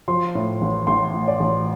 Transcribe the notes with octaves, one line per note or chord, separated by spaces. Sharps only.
F3 C6
A2
A1
A1 C6
A2
D5
A1